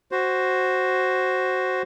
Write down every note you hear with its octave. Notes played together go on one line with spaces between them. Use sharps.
F#4 C5